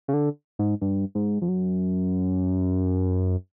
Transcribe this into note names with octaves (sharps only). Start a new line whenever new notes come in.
C#3
D3
G#2
G2
G#2
F2
F#2